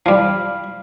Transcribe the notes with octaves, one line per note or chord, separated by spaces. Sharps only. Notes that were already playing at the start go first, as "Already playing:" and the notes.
F3 G3 F5 B5